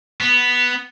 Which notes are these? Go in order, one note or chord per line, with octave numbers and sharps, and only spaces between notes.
B3